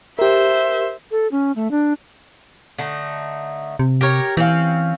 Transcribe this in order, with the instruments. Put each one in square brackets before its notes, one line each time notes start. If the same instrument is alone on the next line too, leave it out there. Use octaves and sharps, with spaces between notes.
[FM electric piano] G4 A#4 [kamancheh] C5 E5
[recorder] A4
C#4
A3
D4
[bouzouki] D3 A3 D#4
[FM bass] C3
[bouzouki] G4 A#4 C#5
[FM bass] E3 [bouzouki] C4 C#4 F5